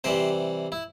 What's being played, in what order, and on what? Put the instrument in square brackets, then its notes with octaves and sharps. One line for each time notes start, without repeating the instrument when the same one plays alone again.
[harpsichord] C3 E3 G3 G4 C5
E4